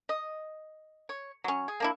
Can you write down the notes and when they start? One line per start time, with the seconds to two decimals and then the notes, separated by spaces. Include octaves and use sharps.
0.09 D#5
1.09 C#5
1.44 F#3 C#4
1.68 G#4
1.80 A#3 D4 E4